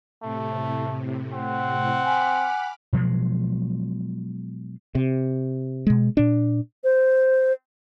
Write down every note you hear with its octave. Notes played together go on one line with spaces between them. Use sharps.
A2 C3 A3
C4 F#5
G#5 B5 D6 F6
B2 F3 F#3 G#3
C3
B2 G#3
A#2 D4
C5